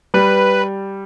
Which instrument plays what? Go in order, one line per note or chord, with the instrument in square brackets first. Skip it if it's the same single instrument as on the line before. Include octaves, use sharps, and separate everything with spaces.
[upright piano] G3 [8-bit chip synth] B4